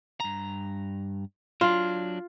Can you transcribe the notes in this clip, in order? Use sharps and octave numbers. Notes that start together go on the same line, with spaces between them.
G2 A#5
F#3 D4 F4